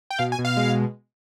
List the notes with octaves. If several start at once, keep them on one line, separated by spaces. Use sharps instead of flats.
G5
B2 F5
G#5
B2
F5
G#3